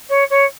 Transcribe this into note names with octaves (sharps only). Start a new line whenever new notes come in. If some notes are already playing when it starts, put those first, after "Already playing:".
C#5
C#5